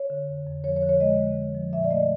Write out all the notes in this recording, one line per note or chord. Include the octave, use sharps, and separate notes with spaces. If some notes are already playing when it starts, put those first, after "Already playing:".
Already playing: C#5
D3
F2
F2
F3 C#5
C#5
D3
C#5
G#3 D#5
D3
F3
F3
A#2 E5
D5
A3 D#5